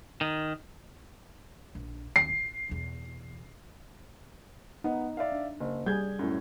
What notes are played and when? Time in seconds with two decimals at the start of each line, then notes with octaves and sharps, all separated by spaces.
0.21 D#3
1.75 A#1
2.16 D#2 C4 C7
2.29 A1
2.69 E2 B2
4.84 B3 D#4
5.17 D5 E5 F5
5.32 D4
5.60 F#1
5.86 G3 G#4 G6 G#6
6.19 F#2 A2